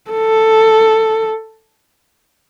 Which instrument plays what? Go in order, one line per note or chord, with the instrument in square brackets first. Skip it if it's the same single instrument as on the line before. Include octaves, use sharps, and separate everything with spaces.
[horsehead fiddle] A4